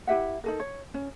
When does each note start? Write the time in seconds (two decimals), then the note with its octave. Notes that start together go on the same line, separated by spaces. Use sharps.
0.07 E4 G4 E5 F#5
0.44 D#4 A4 A#4
0.60 C#5
0.94 C#4